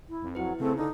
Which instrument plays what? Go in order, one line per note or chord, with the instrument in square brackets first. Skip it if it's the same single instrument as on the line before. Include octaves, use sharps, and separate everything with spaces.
[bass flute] E4
[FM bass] F2
[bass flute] F#3 [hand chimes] E4 B4
[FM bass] C#3 [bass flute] A3 [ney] C4
[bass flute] D3 [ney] D#4